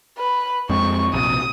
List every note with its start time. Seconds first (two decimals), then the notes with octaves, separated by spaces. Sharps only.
0.18 B4
0.70 F2 G#3 C4 C#6
1.14 A#1 C3 D#6